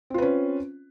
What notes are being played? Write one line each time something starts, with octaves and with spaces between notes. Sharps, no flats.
C4 C#4 F4 B4